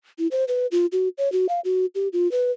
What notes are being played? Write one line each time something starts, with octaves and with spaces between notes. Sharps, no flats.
E4
C5
B4
F4
F#4
C#5
F#4
F5
F#4
G4
F4
B4